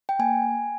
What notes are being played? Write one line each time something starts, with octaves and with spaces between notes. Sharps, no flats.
G5
A#3 G#5